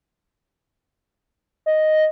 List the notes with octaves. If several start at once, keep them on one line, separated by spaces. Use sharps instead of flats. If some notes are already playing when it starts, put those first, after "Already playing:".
D#5